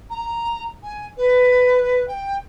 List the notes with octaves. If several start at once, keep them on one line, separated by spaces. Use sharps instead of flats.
A#5
G#5
B4
G5